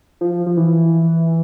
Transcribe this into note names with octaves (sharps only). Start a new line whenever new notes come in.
F3
F3
E3